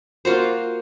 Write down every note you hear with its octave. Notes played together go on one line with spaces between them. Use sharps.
A#3 F4 F#4 C5